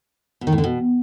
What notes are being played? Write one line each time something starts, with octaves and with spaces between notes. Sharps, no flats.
B2
D#3
A2
D3
B2